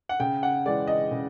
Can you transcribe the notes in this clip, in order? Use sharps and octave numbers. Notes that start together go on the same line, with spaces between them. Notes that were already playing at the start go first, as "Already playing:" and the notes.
F#5
C#3 G5
F#5
E3 G#3 D5
D#5
C#3